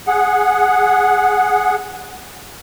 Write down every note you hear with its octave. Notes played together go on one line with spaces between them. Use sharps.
G#4 F#5